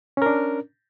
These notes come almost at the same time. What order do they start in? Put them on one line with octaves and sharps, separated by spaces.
C#4 A#4 D4